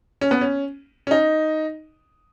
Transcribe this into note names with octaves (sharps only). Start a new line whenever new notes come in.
C#4
B3
C#4
C#4
D#4